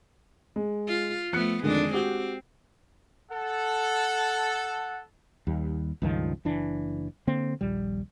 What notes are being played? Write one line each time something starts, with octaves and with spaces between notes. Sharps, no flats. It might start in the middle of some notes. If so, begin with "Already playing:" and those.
G#3
F4
F3 A3 B3 F#6 C#7
F2 D3 D#3 G#3 D4
C4 F#4 G4
A4 F#5
D#2 G3
C#2 G2 D#3 F3
F#1 E3 D4
D3 A#3 C4
D#1 A#1 G3